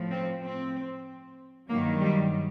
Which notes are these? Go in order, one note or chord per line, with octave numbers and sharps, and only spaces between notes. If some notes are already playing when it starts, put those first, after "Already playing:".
Already playing: A2 F3
C4
C4
G2 D#3 F#3 A#3
G3